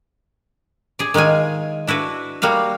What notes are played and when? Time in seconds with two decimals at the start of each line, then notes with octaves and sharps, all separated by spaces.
0.99 G#4 D5
1.14 D#3 G#3 F4 F5 G#5
1.87 D4 E4 F#4 B4
2.42 G3 A#3 F#4 F5